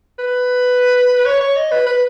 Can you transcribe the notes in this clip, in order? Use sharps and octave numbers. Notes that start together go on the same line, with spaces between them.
B4
C#5
C#5
D#5
B4
B4